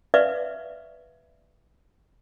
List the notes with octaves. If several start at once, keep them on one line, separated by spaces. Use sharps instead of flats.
B4 D5 E5 F5 C#6